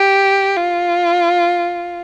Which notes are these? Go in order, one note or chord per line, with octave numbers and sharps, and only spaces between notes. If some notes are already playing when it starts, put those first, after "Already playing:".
Already playing: G4
F4